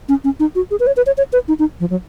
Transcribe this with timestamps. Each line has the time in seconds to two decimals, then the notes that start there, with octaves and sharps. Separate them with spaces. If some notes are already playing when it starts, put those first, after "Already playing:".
0.09 C#4
0.24 C#4
0.40 D#4
0.55 F#4
0.71 G#4
0.80 B4
0.87 C#5
0.97 B4
1.06 C#5
1.18 C#5
1.33 B4
1.48 D#4
1.59 D#4
1.80 F3
1.90 F#3